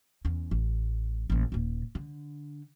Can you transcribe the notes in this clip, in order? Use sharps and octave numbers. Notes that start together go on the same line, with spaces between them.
E2 C#4
A1
A1 A#2
D#1 A#2
D3